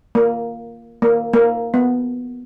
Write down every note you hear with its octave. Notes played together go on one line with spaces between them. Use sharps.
A#3
A#3
A#3
B3